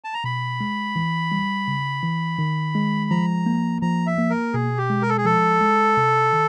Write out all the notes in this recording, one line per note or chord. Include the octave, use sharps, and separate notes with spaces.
A5
A#5
B2 B5
G#3
E3
G3
C#3
E3
D#3
G#3
F3 A#5
A#3
F3 A#5
E5
A#3
A#4
B2 G#4
G4
G#3
A#4
A4
G#4
F3 A4
G#3
C3
D#3